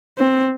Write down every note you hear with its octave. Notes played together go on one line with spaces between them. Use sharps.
C4